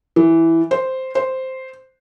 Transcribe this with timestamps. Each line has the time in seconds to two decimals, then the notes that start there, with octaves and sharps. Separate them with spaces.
0.16 E3
0.71 C5
1.15 C5